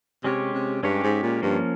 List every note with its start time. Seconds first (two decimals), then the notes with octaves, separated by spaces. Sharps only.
0.24 C3 G#3 C#4 G4 C#5
0.53 C3
0.83 G2 G#3 C#4 G4 C#5
1.03 G#2
1.23 A#2
1.42 G2 F3 A#3 C#4